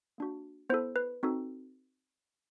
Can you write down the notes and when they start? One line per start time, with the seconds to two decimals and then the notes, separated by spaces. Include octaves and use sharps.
0.18 A#3 D4 F#4
0.69 B3 E4 A4 C5
0.96 B4
1.23 C4 D#4 F#4 A4